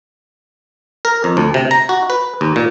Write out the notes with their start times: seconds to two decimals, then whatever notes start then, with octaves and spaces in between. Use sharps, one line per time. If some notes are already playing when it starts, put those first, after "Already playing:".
1.05 A#4
1.24 F2
1.37 D2
1.54 C3
1.71 A#5
1.89 F#4
2.10 B4
2.41 D#2
2.56 A#2